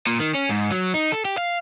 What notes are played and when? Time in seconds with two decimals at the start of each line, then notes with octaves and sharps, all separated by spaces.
0.07 A#2
0.20 D#3
0.35 C#4
0.49 G#2
0.72 F#3
0.94 D#4
1.12 A4
1.25 G4
1.38 F5